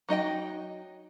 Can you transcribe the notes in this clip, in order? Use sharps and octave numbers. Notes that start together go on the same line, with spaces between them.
F#3 D#4 D#5 G5